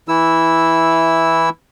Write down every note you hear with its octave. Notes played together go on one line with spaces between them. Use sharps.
E3 E4 E6